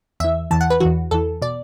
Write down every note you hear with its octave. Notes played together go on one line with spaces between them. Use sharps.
E2 E3 E5
E2 E3 A5
F#5
B4
E2 E3 F#4
E2 E3 A4
B2 D5